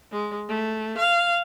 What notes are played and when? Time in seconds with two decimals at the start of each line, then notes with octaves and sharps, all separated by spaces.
0.12 G#3
0.49 A3
0.98 F5